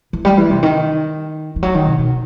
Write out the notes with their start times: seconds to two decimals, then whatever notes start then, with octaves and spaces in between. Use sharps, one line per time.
0.13 E3
0.25 G3
0.38 E3
0.50 C3
0.63 D#3
1.56 E3
1.63 F#3
1.74 D#3
1.87 C3
1.99 B2